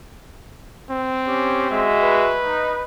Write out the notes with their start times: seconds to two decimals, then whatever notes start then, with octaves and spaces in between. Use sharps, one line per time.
0.90 C4
1.26 C#4 G4
1.70 G#3 F#4 E5
2.02 B4
2.44 D#4